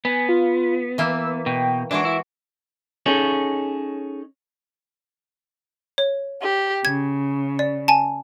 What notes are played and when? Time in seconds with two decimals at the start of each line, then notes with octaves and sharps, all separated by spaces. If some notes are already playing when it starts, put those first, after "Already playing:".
0.05 B3 G#5
0.29 F4
0.98 E3 A#3 E6
1.46 B2 G5
1.91 E3 G#3 D4 F#4 D7
2.05 E4
3.06 C#4 D#4 G#4 A4 C#5
5.98 C#5
6.41 G4
6.85 C#3 G#6
7.59 D5
7.88 G#5 A5